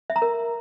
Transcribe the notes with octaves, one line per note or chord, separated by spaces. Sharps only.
E5
A#5
A#4